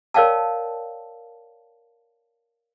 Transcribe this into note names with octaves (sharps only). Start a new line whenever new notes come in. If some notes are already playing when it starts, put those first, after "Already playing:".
A#4 C#5 D5 F5 G5 A5